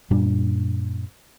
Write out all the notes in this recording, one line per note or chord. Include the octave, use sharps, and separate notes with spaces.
F#2 A#2 G3 D4